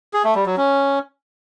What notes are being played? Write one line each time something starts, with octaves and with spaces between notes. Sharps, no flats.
G#4
A3
G3
F#3
C#4